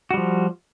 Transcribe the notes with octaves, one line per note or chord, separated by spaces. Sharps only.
F3 G3 F#4